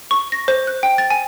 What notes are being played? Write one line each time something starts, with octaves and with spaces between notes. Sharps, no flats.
C#6
A#6
C5
F#6
G5
A6
G#5